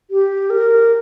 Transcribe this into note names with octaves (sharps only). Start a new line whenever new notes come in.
G4
A#4